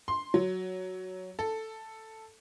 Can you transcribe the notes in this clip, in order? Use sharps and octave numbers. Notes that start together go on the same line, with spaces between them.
C6
F#3
A4